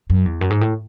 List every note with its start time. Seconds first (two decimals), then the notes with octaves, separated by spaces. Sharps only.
0.10 F#2
0.26 E2
0.41 F#2
0.50 G#2
0.61 A2